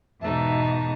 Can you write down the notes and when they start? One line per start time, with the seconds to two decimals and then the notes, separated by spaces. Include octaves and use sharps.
0.22 E2 G#2 B2 D#4 E5 A5